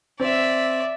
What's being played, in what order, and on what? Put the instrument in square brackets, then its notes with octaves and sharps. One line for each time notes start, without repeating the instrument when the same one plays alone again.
[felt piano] C4 [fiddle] D5 E5